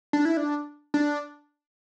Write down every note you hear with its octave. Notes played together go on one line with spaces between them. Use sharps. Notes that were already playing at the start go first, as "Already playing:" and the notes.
D4
E4
D4
D4